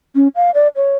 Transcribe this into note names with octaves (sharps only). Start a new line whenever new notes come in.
C#4
F5
D5
C#5